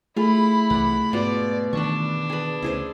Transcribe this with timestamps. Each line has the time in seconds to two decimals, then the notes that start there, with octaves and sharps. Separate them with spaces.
0.17 A3 E4 F4 G#4 B5
0.70 C2 E3 D5 F#5
1.13 G#2 B2 F4 D5 F#5
1.73 D#3 E3 D4 B4 C#6
2.30 G#4 B4
2.62 D2 C#3 E4 G#4 C5